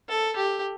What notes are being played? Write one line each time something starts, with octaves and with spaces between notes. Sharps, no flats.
A4
G4